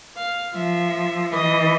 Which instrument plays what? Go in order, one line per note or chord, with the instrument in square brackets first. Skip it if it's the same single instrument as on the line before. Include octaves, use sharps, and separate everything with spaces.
[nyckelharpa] F5
[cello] F3 [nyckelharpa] E5
[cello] E3 [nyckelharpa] D#5